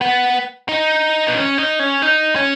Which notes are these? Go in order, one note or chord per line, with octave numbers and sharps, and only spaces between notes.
B3
D#4
B3
C#4
D#4
C#4
D#4
C#4